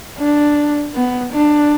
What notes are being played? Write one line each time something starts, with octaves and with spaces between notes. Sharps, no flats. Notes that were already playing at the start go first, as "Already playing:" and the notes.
D4
B3
D4